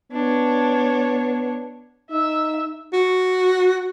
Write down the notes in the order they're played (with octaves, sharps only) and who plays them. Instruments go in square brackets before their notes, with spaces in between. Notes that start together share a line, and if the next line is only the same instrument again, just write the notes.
[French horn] B3 [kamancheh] D4 C#5
[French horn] D#4 [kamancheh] E5 E6
[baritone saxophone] F#4